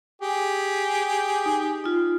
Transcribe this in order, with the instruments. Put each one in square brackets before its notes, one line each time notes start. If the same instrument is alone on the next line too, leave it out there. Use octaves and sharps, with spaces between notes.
[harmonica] G4 G#4
[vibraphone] D#4
D#4 F4